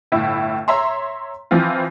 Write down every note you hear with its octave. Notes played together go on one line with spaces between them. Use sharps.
G1 A2 E4
C#5 E5 A#5 C6
E3 F3 C4 E4 F4